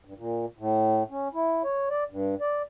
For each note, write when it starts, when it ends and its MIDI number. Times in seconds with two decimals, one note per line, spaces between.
0.05 0.14 43
0.18 0.46 46
0.59 1.03 45
1.10 1.28 61
1.34 1.63 64
1.64 1.89 73
1.90 2.04 74
2.10 2.35 43
2.41 2.62 74